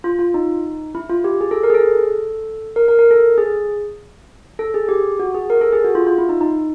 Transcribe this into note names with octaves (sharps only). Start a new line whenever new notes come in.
F4
F4
D#4
E4
F4
G4
G#4
A4
A#4
G#4
A4
A#4
A#4
A#4
A4
G#4
A4
G#4
G4
F#4
G#4
A#4
A4
G#4
F#4
F4
F4
E4
D#4
D#4